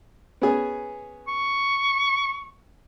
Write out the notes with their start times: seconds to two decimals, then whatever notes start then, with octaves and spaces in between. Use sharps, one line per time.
0.42 B3 C#4 G#4
1.28 C#6